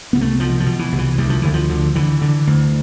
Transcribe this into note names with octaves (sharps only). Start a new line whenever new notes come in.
C2 B3
A3
B2 F3
F3
B2
E3
C2
E3
D2 G3
F3
D2 E3
F3
D3
D3 E3
D3
D2